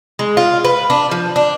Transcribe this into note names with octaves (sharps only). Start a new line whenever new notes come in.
G#3
F4
B4
D4
F3
D4